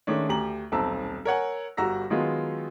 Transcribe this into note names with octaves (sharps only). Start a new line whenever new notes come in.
D#3 G#3 A3 C#4 D4
D2 G4 A#5 F#7
D#1 B1 C4 A5 A#5 E6
A#4 C#5 F#5 G#5
G1 G3 F#4 A#5 E6 A#6
D#3 F#3 G#3 B3 F4